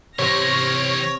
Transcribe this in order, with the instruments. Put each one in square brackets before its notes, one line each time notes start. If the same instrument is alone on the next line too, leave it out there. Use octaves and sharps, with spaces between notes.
[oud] C3 [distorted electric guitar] E3 G4 [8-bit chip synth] C#5 [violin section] F6 A#6